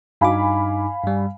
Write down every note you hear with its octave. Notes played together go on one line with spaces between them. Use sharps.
G2 D#4 F5 G#5 B5 D6
G2 G3